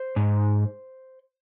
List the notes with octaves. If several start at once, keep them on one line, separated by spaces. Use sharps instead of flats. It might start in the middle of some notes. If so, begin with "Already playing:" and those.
Already playing: C5
G#2